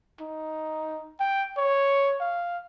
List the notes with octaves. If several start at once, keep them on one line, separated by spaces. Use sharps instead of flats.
D#4
G5
C#5
F5